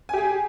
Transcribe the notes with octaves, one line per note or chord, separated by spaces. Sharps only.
G4 G#4 G#5